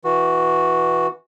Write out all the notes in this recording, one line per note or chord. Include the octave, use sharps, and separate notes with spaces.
E3 F#4